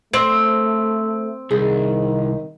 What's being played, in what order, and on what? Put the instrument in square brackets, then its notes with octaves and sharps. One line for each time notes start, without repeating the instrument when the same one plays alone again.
[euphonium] A3 [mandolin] C4 [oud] C5
[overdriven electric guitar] C2 [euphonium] D#3 [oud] G#4